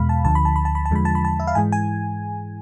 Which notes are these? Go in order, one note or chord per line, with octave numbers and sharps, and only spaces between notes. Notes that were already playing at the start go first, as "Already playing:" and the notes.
Already playing: E2 B2 G#3 F5 B5
A5
D2 D3 F3 A5
B5
A5
B5
A5
B5
A5
E2 D3 F3 G#3 B5
A5
B5
A5
E5
F5
G#2 E3 G#3 G#5
G#5